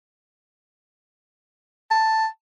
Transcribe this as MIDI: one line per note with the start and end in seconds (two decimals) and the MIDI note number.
1.90 2.26 81